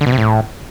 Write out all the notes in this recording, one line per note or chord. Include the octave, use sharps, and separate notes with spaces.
D3
B2
C3
A2